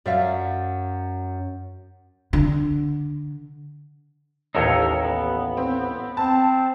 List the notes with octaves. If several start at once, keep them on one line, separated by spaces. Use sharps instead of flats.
F#2 D5 E5 F5
D3
A1 D#2 D#4 A4 A#4 C#5
B3
C4
C4 A5